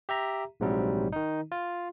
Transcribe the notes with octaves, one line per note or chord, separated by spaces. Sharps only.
G4 E5 A#5
A#1 G#2 C3 F#3 G3
D#3 D#4
F4